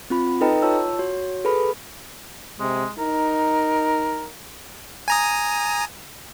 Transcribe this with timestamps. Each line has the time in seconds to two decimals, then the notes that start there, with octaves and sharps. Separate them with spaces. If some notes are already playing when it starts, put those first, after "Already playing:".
0.10 C4 F4 B5
0.41 D#4 A4 B4 D#5 G5 A#5
0.62 F4 C#5 A5 E6
0.99 F#4 C#5
1.45 G#4 A4 B4 B5
2.60 C3 G#3
2.99 D#4 A#4
5.08 G#5 A#5 D#6